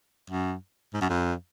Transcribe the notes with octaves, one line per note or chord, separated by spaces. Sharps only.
F#2
G#2
F#2
F2